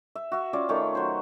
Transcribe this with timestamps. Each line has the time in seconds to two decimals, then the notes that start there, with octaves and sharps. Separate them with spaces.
0.15 E5
0.32 F#4 E5
0.53 C#4 F4 D5
0.69 D#3 A3 C#4
0.95 F#3 C5